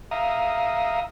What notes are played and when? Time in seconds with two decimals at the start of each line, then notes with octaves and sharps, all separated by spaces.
0.11 E5 F5 A#5 D#6